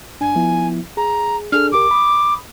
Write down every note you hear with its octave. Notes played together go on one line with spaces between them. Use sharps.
F#2 D4 G#5
F3 B3 E4
G#4 A#5
D4 G#4 A4 F6
C#2 G4 A#4 D6
B5 D#6